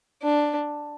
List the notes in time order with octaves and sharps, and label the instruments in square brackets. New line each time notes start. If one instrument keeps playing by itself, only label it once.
[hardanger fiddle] D4